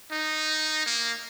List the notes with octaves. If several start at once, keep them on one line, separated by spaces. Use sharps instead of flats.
D#4
A#3